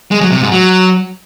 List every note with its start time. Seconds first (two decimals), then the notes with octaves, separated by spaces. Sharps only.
0.11 G#3
0.21 F#3
0.31 C3
0.41 G#2
0.51 F#3